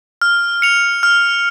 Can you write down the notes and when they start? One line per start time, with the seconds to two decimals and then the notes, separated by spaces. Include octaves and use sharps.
0.22 F6
0.62 C#7 F7
1.03 F6